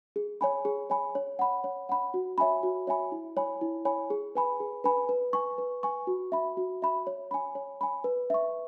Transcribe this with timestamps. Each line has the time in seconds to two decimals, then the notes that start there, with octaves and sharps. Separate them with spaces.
0.16 G#4
0.41 C#5 G#5 B5
0.65 G#4
0.90 C#5 G#5 B5
1.15 C#5
1.39 F#5 B5
1.64 C#5
1.89 F#5 B5
2.14 F#4
2.38 C#5 E5 G#5 B5
2.63 F#4
2.87 C#5 E5 G#5 B5
3.12 E4
3.37 C#5 G#5 B5
3.61 E4
3.85 C#5 G#5 B5
4.10 G#4
4.35 B4 G#5 B5
4.60 G#4
4.84 B4 G#5 B5
5.09 B4
5.33 G#5 C#6
5.58 B4
5.83 G#5 C#6
6.07 F#4
6.32 E5 B5
6.57 F#4
6.82 E5 B5
7.07 C#5
7.31 G#5 B5
7.55 C#5
7.81 G#5 B5
8.04 B4
8.30 E5 C#6